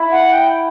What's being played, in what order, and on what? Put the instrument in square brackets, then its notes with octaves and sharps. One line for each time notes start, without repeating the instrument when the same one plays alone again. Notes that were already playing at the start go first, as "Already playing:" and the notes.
Already playing: [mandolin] E4
[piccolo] F#5
G5